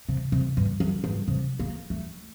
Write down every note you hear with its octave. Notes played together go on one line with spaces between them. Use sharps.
C3
C3
G2
F#2
G2
C3
A#3
A3